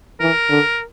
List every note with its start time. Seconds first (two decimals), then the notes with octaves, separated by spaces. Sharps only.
0.20 E3 A#4
0.50 D3